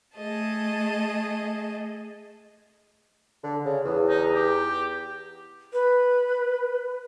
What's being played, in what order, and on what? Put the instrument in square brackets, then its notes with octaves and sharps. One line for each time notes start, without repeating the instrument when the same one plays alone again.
[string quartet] A3 G#4 D#5 A5
[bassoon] D3
C#3
E2
[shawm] D#4
G4
[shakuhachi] B4